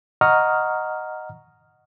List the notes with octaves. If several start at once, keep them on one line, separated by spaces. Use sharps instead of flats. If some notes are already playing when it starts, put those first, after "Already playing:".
D#5 F#5 A#5 C#6 D#6 F6